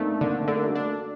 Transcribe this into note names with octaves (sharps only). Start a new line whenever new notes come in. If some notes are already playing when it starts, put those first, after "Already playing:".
Already playing: A3 A#3 C4 D4 D#4
D3 A#3 D4
D3 A4
A#4
F#4 A4
D4